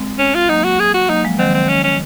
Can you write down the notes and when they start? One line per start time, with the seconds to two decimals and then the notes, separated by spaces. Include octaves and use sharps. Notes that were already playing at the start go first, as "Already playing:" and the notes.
Already playing: G#3 C4
0.19 C#4
0.35 F4
0.49 F#3 A#3 D#4
0.64 F#4
0.80 G#4
0.94 F#4
1.09 F#3 A#3 D#4
1.24 F3 G#3
1.39 D#3 F#3 C4
1.54 C4
1.69 C#4
1.84 C#4